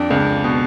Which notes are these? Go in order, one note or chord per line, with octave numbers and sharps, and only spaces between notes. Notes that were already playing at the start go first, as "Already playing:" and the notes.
Already playing: F2 D4
C#2
B2